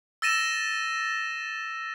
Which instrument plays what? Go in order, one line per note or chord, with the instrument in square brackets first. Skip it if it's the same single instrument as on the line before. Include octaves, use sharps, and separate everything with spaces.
[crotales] E6 A6 A#6 D#7 E7